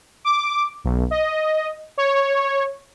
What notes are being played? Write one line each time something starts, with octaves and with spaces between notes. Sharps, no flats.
D6
B1
D#5
C#5